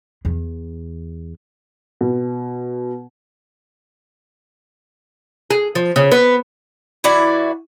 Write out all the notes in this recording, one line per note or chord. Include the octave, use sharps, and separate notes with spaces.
E2
B2
G#4
F3
C#3
B3
E3 E4 F#4 D5